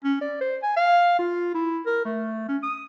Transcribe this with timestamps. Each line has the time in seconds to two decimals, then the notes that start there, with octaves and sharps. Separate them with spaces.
0.04 C#4
0.21 D5
0.41 C5
0.62 G#5
0.76 F5
1.19 F4
1.54 E4
1.86 A#4
2.05 A3
2.48 C#4
2.63 D#6